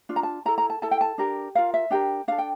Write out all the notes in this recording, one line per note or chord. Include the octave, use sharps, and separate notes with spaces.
D4 F4
A#5
A5
E4 A4 A#5
A#5
A5
E4 A4 A5
G5
A5
D4 G4 A#4
F4 A#4 F5
E5
D4 G4 A#4 G5
D4 A4 F5
G5